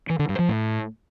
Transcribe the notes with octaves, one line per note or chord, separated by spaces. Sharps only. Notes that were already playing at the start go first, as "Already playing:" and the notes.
E3
D3
G2
F3
A2